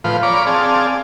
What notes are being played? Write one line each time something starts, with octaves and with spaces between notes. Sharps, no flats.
A2 F3 F4 B4 C5
C#5 D5 F5 A#5 B5 D6
C4 G#4 D5 F5 A5